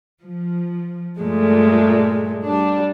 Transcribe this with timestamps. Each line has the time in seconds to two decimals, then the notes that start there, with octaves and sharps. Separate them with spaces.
0.21 F3
1.19 G2 A#2 G#3 A3
2.44 G3 D4